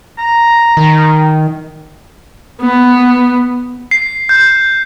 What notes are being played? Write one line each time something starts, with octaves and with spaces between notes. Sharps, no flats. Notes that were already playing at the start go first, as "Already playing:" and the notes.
A#5
D#3
B3
C7
G6